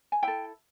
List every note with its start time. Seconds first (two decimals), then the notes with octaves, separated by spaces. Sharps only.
0.12 G#5
0.23 E4 A4 G5